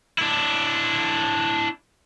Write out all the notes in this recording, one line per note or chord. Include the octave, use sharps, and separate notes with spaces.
D4 E4